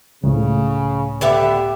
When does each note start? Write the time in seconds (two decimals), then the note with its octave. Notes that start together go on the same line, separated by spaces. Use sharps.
0.23 C#2 A2 C#3
1.21 D3 B3 G4 E5